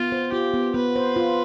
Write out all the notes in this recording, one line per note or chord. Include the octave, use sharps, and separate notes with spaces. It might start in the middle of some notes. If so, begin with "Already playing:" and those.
Already playing: B3 F4
C5
F4 G4
B3
B3 B4
C5
F4